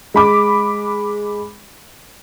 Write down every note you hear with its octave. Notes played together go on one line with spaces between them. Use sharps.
G#3 B5 D6